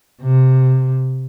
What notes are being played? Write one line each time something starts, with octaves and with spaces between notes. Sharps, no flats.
C3